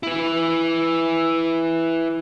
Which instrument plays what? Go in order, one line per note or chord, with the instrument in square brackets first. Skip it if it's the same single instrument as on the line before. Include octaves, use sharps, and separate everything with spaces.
[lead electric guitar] E4 B4